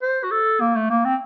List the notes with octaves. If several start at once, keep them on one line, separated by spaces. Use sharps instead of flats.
C5
F#4
A4
A#3
A3
A#3
C4